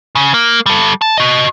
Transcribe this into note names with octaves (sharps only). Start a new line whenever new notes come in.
C#3
A#3
G3 A4
A5
F#4 D#5